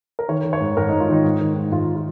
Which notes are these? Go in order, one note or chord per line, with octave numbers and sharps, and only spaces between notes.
A#4
D#3 C#5
D#3
C#5
G#2
G#2 A#4
D#4
G#2
F4
D#3 D#4
G#2
D#3
G#2
G#2 F4
F4